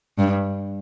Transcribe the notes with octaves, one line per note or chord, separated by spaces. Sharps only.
G2